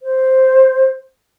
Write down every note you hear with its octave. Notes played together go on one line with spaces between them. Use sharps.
C5